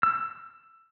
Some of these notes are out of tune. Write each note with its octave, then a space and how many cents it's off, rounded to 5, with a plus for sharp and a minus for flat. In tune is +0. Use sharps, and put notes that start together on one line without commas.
E6 +15